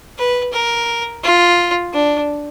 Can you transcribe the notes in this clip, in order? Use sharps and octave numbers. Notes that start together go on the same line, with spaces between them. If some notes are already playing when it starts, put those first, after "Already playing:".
B4
A#4
F4
D4